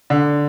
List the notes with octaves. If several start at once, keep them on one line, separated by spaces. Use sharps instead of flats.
D3